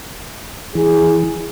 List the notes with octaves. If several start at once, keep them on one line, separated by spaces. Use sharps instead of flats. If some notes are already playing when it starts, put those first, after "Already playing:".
E3 G#4